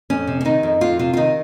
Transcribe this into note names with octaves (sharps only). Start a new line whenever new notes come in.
F2 C#4
C3
C#4
D#3 D#4
F2
F2 F4
C3 F4
F4
D#3 D#4